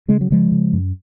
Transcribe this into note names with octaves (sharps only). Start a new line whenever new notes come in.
C#3 G#3
F#3
C#3 F3 G#3
C#3
F#2